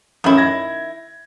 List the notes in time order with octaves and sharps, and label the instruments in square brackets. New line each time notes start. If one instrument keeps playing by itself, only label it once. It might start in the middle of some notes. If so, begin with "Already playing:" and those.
[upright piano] A1 F#2 [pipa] D#3 E4
[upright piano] G#6 A#6